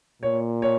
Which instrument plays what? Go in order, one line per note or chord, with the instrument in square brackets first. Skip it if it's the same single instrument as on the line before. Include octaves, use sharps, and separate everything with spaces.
[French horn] A#2 [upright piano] C#5
[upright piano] C#5